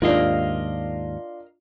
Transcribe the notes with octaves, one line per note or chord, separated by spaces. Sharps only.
D#2 G#2 D4 F4 A#4 D#5 F5